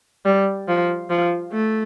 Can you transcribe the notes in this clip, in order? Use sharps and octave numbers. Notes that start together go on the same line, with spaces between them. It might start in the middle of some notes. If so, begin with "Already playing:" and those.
G3
F3
F3
A3